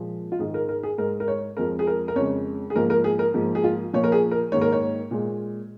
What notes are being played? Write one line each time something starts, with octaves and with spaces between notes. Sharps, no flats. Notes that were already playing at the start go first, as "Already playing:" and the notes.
Already playing: A#2 F3 G#3
F4
G#2 D#3 G#3 G#4
A#4
A#4
G#4
G#2 G#3 A#4
A#4
C#5
F2 F3 G#3 A#4
G#4
A#4
A#4
F2 C#3 G#3 C#5
G#4
G#2 F3 A#3 A#4
A#4
G#4
A#4
G#2 F3 A#3
G#4
F4
A#2 F3 A#3 C#5
A#4
G#4
A#4
G#2 D#3 A#3 C#5
A#4
C#5
A#2 G#3